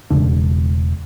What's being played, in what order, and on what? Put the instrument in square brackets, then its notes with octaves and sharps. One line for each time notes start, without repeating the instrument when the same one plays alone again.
[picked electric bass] E1 C#3 D4